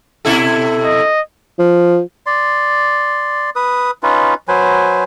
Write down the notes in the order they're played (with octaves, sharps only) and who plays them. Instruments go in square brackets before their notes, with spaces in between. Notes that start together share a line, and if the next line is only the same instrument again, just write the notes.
[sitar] B2 E4 A4
[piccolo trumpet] D#5
[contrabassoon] F3
[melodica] D5 C6
B4 D#6
C#4 D#4 F4 B4
F#3 B4 C5 G#5